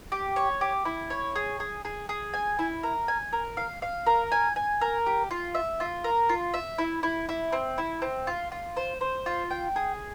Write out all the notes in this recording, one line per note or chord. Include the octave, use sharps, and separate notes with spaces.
G4
C#5
G4
E4
C#5
G#4
G#4
G#4
G#4
G#5
E4
A#4
G#5
A#4
F5
F5
A#4
G#5
G#5
A#4
G4
F4
E5
F4
A#4
F4
E5
E4
E4
E4
C4
E4
C4
F4
F4
C5
C5
F4
G5
G#4